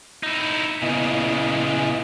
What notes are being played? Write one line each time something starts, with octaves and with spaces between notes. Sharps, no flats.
D#4 E4
A#2 C#3 B3 E4 D#5